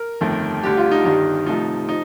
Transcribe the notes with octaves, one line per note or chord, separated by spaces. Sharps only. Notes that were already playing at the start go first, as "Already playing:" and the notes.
Already playing: A#4
G1 F2 D#3 A3
D2 D3 G3 G4
F4
D#4
G1 G2 D#3 G3 D#4
C2 C3 F3 A3 D#4
F3 D#4